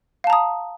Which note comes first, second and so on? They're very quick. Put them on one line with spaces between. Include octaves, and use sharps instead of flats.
F5 A5 A#5 D#6